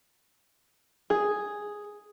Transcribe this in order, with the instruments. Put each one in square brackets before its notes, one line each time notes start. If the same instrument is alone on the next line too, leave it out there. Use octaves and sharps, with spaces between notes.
[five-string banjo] G#4